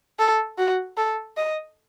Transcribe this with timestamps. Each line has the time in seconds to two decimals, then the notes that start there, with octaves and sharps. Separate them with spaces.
0.19 A4
0.58 F#4
0.97 A4
1.37 D#5